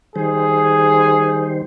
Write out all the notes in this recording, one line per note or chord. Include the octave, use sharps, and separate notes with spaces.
D#3 G3 G#4 C5